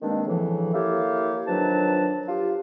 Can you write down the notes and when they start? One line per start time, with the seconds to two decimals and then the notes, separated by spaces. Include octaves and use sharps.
0.01 G2 D#3 G#3 A#3 C4 D4
0.27 A2 C#3 E3 F3
0.73 A#3 E4 G4 A4 C#5 F5
1.47 D#3 F3 F#3 D4 B4 A5
2.28 F4 G4